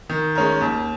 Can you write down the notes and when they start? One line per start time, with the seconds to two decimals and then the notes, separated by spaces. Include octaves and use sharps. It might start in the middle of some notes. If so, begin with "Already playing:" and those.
0.10 D#3
0.35 G#3 C#4 A#4
0.61 D#2